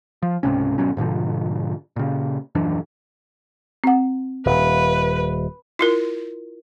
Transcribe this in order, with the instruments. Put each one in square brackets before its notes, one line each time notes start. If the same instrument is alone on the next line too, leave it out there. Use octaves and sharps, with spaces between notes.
[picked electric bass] F3
C#2 G#2 C3 C#4
G#1 B2 F#3 C#4
G#2 B2 D3 F3
A#2 C#3
D#1 F#2 E3 D4
[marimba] C4 F#5
[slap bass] D#1 [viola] B4
[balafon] E4 F4 A#4